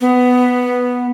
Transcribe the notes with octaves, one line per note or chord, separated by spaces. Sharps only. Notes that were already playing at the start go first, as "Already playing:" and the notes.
B3